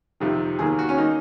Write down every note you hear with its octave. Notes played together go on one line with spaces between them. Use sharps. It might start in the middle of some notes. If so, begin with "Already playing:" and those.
F2 C3 D#3
D#2 D#3 A#3 G#4
F#4
C#4
D#3 A#3 D#4